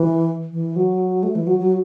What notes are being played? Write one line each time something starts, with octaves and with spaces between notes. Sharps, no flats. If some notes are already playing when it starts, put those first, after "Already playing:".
Already playing: E3
E3
F#3
A3
E3
F#3
F#3